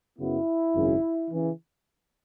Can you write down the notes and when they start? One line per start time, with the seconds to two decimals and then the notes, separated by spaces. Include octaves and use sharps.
0.19 F#2 C#3 F#3 B3 E4
0.75 G#1 F#2 C#3
1.31 C#3 E3